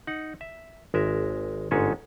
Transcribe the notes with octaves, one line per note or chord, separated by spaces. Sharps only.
D#4 F#5
E5
G#1 G#3 A#4 E5
G1 G#2 G#3 C#4 G#4 A4